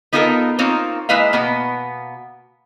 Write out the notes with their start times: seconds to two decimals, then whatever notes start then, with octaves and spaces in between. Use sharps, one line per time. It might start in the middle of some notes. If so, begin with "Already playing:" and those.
0.13 B3 D#4 F4 G4 A4 A#4
0.59 A#3 C4 D#4 F4 C#5
1.09 G#3 A#3 E4 B4 D#5 F5
1.33 B2 A#3 B3